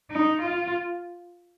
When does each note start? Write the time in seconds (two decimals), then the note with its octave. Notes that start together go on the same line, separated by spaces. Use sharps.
0.11 D#4
0.42 F4